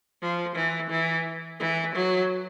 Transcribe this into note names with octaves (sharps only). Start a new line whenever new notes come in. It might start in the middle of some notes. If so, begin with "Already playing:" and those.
F3
E3
E3
E3
F#3